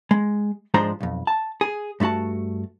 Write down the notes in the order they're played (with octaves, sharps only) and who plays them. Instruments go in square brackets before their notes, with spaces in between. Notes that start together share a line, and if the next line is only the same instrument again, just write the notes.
[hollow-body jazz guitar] G#3
G#2 F3 G#3 D4 C5 A#5
B1 F2
A5
G#4
G2 A3 B3 F#4 A5